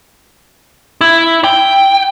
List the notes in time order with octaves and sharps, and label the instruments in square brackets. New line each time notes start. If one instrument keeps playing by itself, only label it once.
[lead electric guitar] E4
G5